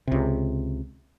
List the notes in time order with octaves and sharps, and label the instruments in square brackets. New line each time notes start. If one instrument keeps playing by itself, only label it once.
[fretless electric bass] C#2 C3